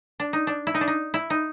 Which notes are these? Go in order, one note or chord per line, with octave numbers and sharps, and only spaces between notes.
D4
D#4
D4
E4
D#4
D4
D#4
E4
D#4